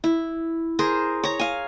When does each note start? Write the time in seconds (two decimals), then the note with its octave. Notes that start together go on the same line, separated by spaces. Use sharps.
0.04 E4
0.79 G#4 A#4 C5
1.23 C#5 A#5
1.39 F5 G#5